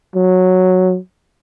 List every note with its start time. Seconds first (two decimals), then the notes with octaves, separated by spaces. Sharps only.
0.16 F#3